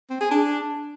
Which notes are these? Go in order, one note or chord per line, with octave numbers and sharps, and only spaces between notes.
C4
G#4
D4